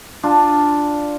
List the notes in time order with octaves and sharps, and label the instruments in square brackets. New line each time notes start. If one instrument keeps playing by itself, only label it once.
[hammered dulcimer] D4 F4